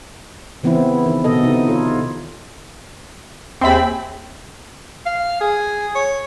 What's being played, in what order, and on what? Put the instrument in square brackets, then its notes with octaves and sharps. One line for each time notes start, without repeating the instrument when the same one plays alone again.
[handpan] C#3 E3 B3 C4 E4
D#3
B2 D3 B3 A4 D#5
C3 C4 D#4 E4
F4 A4 C#5
[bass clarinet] D#2 [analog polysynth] C4 B5 [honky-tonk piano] G#4 E5 G5
[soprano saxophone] F5
G#4
C#5